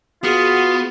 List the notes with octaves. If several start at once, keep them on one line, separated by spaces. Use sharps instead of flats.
B3 F4 F#4 G#4